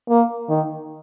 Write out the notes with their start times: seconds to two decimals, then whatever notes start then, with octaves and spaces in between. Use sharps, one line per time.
0.09 A#3
0.49 D#3